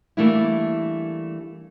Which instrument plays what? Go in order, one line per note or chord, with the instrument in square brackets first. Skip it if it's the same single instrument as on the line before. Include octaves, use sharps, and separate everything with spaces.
[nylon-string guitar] E3 G3 A3 A#3 D4 E4